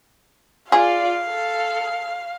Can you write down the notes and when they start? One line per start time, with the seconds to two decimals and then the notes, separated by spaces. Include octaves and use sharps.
0.72 F4 G#4 D5 F5
1.27 A4